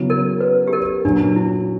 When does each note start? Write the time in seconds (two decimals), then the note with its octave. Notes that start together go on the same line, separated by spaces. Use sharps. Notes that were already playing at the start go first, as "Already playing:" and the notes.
Already playing: C#3 F#3 B3 E4
0.10 A#4
0.41 B4
0.67 G4
0.73 A#4
1.05 A#2 F#3 C#4 D4 F#4
1.36 E4